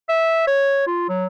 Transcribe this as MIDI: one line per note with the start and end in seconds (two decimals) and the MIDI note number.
0.09 0.46 76
0.47 0.83 73
0.87 1.05 65
1.09 1.27 54